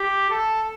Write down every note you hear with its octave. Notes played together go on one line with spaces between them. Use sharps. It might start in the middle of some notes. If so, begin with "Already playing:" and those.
Already playing: G4
A4